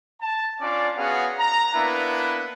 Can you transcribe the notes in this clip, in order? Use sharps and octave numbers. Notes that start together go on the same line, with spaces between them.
A5
C#4 D4 F4 D5
B3 C#4 F#4 G#4 F5 F#5
A#5
A#3 B3 D4 E4 B4 E5